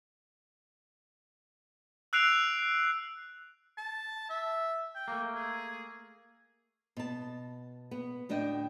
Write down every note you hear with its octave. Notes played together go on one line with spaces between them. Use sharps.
E6 F#6 C7 D7 F7
A5
E5
G5
A3 A#3
G#4
B2 A5
B3
D2 A2 D4 D#5 G5